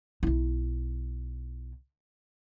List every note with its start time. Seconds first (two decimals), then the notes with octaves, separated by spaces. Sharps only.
0.23 B1 E4